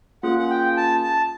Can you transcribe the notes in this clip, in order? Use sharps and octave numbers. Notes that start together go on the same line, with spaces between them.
A#3 C#4 F4 G#4 F#5
F#5
G5
A5
A5